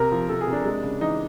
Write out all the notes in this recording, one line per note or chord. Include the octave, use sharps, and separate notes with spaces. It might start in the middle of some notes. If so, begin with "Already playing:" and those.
Already playing: C3 A#4
F3
C3 A4
G#4
C3
D4
G#3
C#3
E3 D#4